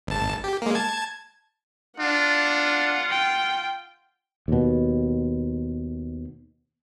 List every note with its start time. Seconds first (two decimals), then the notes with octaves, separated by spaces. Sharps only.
0.07 G#1 A5
0.44 G4
0.62 G#3 A#3
0.75 A5 G#6
1.99 D4 F4 F#5
3.10 G5
4.48 D#2 B2